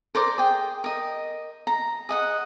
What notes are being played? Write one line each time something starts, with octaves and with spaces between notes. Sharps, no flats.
A#4 C5 D5 D6
G#4 G5
A#4 D#5
A#5
G#4 D#5 F#5